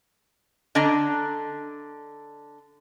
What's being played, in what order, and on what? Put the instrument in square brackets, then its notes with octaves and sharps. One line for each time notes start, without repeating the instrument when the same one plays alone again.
[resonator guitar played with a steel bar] D3 D4 D#5 A#5